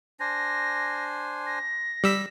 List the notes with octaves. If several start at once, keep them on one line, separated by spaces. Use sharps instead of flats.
D4 C5 G#5 A#6
A#6
G3 E6 B6